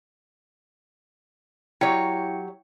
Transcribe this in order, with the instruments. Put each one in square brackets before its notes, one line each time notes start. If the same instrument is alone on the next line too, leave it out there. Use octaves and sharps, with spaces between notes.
[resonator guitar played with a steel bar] F#3 G4 C#5 [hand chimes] E4 G5 C#7